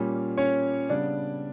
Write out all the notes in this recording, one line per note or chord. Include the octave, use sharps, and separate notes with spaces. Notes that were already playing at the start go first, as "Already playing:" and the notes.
Already playing: A#2 G3 A#3 C#4
C#4 C#5
C#3 G3 B3 D4 D5